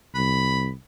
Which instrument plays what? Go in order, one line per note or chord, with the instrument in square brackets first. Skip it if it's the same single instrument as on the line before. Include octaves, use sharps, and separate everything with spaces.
[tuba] C2 [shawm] B5